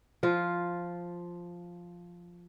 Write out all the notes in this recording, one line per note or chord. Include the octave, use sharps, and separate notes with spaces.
F3 F4